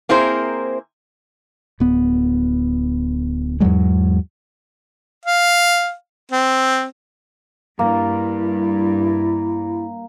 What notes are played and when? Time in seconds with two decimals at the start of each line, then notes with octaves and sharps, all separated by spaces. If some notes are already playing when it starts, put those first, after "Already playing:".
0.09 A#3 C4 E4 G#4 A#4 C5
1.80 D1 B3
3.60 E2 G#2 F#3 G#3
5.25 F5
6.32 C4
7.79 G2 A#3 E4